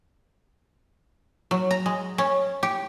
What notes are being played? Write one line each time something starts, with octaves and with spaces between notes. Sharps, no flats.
F#3
A#5
G#3
C#4
G4